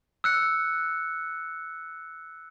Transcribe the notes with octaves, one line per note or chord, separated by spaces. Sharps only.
E6 F#6 C#7